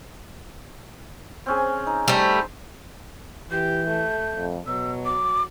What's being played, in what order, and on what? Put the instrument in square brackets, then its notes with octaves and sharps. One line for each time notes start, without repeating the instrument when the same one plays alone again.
[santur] C4 C#4 G#4
D#4
[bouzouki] G3 A3 [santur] C5
[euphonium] E3 [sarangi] G4 [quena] G6
[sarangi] A3
[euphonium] F2
[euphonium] B2 [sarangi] F#3 [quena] E6
[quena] D6